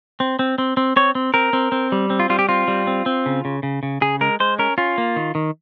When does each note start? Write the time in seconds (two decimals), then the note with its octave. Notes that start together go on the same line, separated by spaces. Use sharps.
0.20 C4
0.39 C4
0.58 C4
0.77 C4
0.96 C4 C#5
1.15 C4
1.34 C4 A#4
1.53 C4
1.72 C4
1.92 G3
2.10 C4
2.20 F4
2.30 G3 F4
2.39 G4
2.49 C4 F4
2.68 G3
2.87 C4
3.06 C4
3.26 C#3
3.45 C#3
3.63 C#3
3.83 C#3
4.01 C#3 G#4
4.21 G#3 A#4
4.40 G#3 C5
4.59 C#4 A#4
4.78 C#4 F4
4.98 A#3
5.16 D#3
5.35 D#3